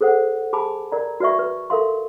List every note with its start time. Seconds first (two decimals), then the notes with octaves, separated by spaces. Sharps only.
0.01 G#4 A4 C5 C#5 F#5
0.53 G4 G#4 G#5 A5 B5 D6
0.92 A#4 D5 A#5
1.20 F#4 B4 D5 E5 C#6
1.39 B4
1.70 A4 A#4 E5 F5 C6